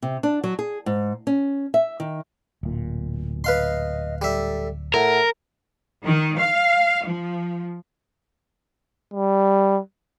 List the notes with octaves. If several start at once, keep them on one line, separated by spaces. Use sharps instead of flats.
C3
D4
F#3
G#4
G#2
C#4
E5
D#3
D1 A#2
B4 D#5 F5 C6
G3 A4 E5
A2 A#4 F#5
D#3
F5
F3
G3